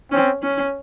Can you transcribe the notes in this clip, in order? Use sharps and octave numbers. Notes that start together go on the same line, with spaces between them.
C4 C#4
C#4